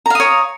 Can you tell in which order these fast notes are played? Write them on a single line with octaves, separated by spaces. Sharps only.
A#5 F5 D#6 C#5